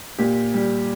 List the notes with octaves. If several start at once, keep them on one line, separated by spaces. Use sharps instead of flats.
A#2 G4
G3